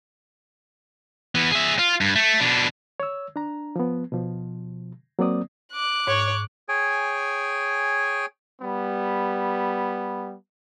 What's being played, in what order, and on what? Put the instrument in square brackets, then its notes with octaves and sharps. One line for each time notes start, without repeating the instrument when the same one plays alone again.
[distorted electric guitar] E3 B3
G#4 E5
F4
G2
A3
B2 D4
[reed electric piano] C#5 E6
D4 A#5
F3 B3
B2 F3
F#3 A#3 C4 D5 D#6
[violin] D6 F#6
[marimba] G#2 [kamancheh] C#5
[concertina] G#4 C#5 G5 G#5
[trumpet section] G3 B3